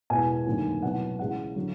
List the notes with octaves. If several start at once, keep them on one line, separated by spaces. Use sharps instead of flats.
E1 E2 B2 G#5
F1 D#2 D3 F#3
C2 B2 F#3 F#5
C#2 C#3 E3 F#5
D3 F#3